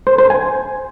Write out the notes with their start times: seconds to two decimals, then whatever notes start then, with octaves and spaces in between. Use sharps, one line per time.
0.07 C5
0.18 C5
0.30 G#5